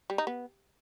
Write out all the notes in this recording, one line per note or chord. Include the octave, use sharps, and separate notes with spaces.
G3
D#4
B3